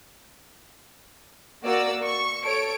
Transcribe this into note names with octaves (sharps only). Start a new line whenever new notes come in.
A#3 F#4 D5 E6
C#6
A4 C#5 D7